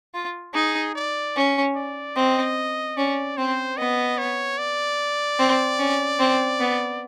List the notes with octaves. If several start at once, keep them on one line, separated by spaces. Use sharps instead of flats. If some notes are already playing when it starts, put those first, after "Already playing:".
F4
D#4 G#4
D5
C#4
D5
C4 D#5
C#4 D5
C4 C5
B3 D#5
C#5
D5
C4
C#4
C4
B3